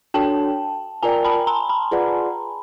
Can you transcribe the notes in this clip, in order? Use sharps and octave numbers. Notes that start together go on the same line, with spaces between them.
D4 F#4 A4 C#5 G5 A5
F4 A#4 D5 G5 G#5 A#5
A5 B5
A#5 C6
A5 B5
F4 G#4 B4 D5 F#5